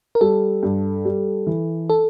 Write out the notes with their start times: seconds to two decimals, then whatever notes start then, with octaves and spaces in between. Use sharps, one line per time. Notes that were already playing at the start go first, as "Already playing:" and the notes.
0.15 A#4
0.21 G3 A4
0.63 G2
1.05 G3
1.47 E3
1.90 A4